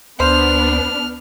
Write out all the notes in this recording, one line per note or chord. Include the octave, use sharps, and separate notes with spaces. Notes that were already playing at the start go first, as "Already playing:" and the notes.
D2 B3 D4 C5 F6